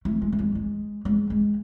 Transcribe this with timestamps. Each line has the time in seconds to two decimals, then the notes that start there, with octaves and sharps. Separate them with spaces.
0.05 A3
0.22 G#3
0.32 A3
0.39 G#3
0.55 G#3
1.05 G#3
1.30 G#3